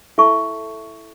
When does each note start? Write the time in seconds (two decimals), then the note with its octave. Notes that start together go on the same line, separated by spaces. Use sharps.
0.18 E4 A4 E5 A5 C#6